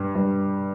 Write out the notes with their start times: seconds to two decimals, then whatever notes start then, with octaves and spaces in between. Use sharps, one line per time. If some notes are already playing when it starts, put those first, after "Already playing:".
Already playing: G2 G3
0.15 G2